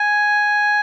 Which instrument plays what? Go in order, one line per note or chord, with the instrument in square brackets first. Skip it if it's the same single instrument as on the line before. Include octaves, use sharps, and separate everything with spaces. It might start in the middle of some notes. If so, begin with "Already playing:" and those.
Already playing: [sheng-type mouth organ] G#5